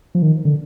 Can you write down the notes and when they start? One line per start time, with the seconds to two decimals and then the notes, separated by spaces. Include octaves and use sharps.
0.15 F3
0.22 D#3
0.45 D3